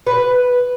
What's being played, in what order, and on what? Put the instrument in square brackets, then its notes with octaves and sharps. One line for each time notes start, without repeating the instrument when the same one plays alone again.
[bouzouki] B4